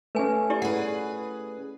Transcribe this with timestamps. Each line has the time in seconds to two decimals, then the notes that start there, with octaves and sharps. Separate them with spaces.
0.15 A3 C#4 B4 G#5
0.50 E4 G4 D5
0.62 G#4 B4 F#5